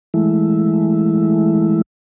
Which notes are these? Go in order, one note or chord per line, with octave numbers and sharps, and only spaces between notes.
E3 G#3 A3 E4